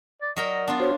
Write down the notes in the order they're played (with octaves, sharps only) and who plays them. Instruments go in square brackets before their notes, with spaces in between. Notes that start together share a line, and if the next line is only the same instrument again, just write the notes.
[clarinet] D5
[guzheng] F#3 A#4 G5 [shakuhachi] D5 [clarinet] D#5
[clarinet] B3 [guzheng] D4 F4
[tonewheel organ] F#4 C5 [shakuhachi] C#5